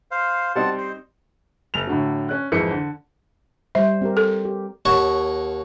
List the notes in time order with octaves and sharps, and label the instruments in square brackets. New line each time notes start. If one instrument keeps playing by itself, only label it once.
[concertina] C5 F5
[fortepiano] G3 C4 D#4 [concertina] F#5 A5
[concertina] C5
[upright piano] F#1 F7
A2 D3 F#3
C#4 F#6
G#1 F2 E3 G#4 C#7
D3
[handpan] G3 C5 [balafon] E5
[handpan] C4 G4 A#4
[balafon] A4
[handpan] G4
[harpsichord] D#2 C#5 F#5 A5 A#5 C#6